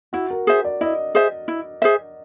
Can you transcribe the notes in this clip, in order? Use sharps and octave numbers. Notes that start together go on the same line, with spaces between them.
E4 F#4
A#4
G#4 C5 E5
D5
E4 D#5
G#4 C5 E5
E4
G#4 C5 E5